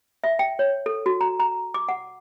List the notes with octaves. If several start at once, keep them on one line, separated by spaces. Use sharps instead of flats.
E5
G5
C#5
A4
F#4
A#5
A#5
D6
F#5